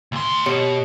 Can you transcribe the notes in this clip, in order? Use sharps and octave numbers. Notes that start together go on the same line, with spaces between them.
D2 C6
B2 G4 C#5 C#7